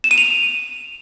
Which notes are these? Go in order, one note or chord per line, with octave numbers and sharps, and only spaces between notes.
E7
D#7
F7